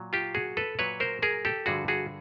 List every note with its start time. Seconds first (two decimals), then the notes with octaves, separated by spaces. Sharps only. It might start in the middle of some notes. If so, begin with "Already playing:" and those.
Already playing: A#2 F#3
0.13 F4 G4
0.35 F#4 G#4
0.57 A4 B4
0.79 A#2 F#3 B4 C#5
1.00 A#4 C5
1.22 G#4 A#4
1.45 G4 A4
1.66 G2 D3 F3 F#4 G#4
1.88 F#4 G#4